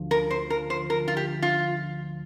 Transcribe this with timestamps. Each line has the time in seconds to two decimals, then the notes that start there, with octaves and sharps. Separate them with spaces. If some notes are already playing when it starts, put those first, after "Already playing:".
Already playing: D2 F3
0.11 A#4
0.30 C5
0.50 A#4
0.70 C5
0.90 A#4
1.08 F4
1.17 G4
1.42 F4